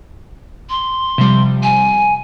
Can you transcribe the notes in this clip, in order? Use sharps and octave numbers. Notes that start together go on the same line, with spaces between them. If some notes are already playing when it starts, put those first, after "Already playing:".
C6
C3 F3 G3
G#5